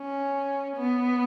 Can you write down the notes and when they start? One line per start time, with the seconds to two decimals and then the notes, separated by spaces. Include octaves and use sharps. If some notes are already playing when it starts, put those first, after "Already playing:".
Already playing: C#4
0.76 B3